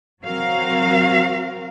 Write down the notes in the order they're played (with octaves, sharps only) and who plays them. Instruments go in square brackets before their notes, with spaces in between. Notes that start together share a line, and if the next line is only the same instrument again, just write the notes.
[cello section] F#3 C4 F#4 A#4 F5